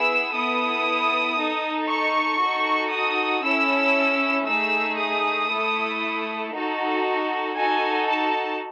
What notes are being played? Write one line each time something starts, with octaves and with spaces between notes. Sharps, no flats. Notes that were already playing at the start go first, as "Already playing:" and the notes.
Already playing: B3 E4 G#4 E6
B3 E4 A4 D#6
D#4 A4
C#6
D#4 F#4 A4
D#6
C#4 E4 A4 E6
A3 D#4 G#4 E6
D#6
A3 E4 A4
D#4 F#4 A4
D#4 F#4 A4 G#5
A5